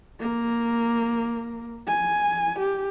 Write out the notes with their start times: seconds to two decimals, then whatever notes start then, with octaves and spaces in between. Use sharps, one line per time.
0.20 A#3
1.88 G#5
2.59 G4